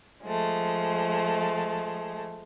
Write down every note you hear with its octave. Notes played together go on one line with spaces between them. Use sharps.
F3 G#3 A3